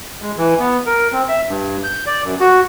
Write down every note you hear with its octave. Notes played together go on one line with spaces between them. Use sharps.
G#3
E3
B3
A#4
C4
E5
G2
G6
D5
F#2
F#4